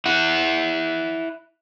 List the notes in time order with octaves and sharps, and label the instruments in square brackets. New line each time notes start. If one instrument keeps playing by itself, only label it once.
[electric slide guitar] E4 F#5